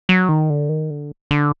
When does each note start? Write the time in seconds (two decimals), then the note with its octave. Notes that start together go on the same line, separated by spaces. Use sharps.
0.09 F#3
0.29 D#3
0.50 D3
0.69 D#3
0.90 D3
1.31 D3